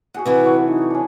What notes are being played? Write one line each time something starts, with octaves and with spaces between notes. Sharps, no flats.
D#2 F#4 G#4 F#5
C3 E3 F#3 B4
F#4 A4 C#5
D#4
C#4 D4